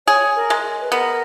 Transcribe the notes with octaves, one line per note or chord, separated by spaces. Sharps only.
G#4 C#5
A#4
G#3
B4
B3 A#4